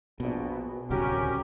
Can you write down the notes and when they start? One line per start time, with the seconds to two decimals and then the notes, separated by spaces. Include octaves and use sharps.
0.20 A#1 B2
0.90 D1 C2 C#3 C#4 F#4 G4 A#4